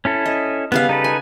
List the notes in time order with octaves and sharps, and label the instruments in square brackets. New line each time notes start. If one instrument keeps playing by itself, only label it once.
[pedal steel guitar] C#4 E4 A4
[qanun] D#5
[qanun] C#3 G3 F5 [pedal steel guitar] B3
[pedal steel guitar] D#4 A4 B4
[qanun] G#5